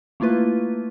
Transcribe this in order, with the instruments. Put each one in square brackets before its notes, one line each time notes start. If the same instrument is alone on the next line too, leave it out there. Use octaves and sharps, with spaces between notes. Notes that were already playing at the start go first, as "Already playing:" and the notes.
[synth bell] A3 A#3 E4 F4 B4